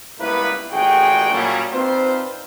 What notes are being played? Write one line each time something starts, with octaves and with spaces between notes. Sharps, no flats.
C#2 G2 A#3 B3 E4 B4
A1 E2 A#2 F#4 G#4 G5
A#2 C#3 F#3 G3
C4 D4 D#4 F4 B4 C5